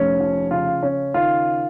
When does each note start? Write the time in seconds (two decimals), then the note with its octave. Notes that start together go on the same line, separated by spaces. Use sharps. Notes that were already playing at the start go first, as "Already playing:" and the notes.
Already playing: F1 C#4
0.20 F3
0.51 C#3 F4
0.83 C#3 C#4
1.14 D#3 F4